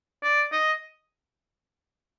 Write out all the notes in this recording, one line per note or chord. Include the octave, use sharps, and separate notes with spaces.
D5
D#5